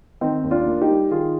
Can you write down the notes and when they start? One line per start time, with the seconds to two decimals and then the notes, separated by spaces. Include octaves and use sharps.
0.21 D#3 C4 D#4
0.44 D#2
0.51 D4 F4
0.66 A#3
0.81 D#4 G4
0.89 G3
1.11 D#3 F4 G#4